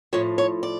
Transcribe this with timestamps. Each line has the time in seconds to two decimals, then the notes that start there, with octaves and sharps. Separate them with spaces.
0.13 A2 F3 C#5
0.38 C#5
0.63 D5